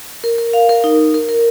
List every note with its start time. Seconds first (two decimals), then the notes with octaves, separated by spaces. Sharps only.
0.24 A#4
0.38 A#4
0.53 F5
0.69 A#4
0.84 D#4
0.99 A#4
1.14 A#4
1.29 A#4